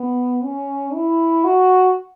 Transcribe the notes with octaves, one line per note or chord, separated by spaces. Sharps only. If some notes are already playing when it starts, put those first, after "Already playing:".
Already playing: B3
C#4
E4
F#4